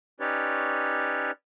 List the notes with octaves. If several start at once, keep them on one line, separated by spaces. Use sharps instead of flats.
C#4 D#4 G4 B4 C#5 D5